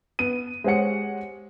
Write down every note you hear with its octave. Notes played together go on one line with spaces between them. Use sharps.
B3 D#7
G#3 G4 C5 C#5 F#5 C#7